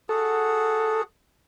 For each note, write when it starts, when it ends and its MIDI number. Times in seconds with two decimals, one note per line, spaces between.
0.09 1.03 66
0.09 1.03 68
0.09 1.02 69
0.09 1.03 78